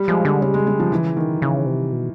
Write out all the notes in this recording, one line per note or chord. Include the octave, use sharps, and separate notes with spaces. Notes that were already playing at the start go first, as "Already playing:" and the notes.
Already playing: G3
F3 G#3
D3 G3
C#3 G3
G#3
G3
F3
E3
D#3
C#3 E3
C3
B2